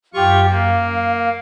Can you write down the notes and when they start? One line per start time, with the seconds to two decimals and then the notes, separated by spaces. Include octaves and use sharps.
0.14 F#2 F4 G4 C#6
0.49 A#3 F5